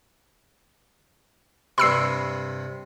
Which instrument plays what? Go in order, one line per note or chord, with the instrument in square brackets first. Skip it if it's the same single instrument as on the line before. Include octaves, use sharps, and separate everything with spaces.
[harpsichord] G2 C3 [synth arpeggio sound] B5 E6 C7